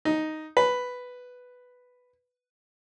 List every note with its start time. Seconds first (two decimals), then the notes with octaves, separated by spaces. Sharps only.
0.05 D#4
0.57 B4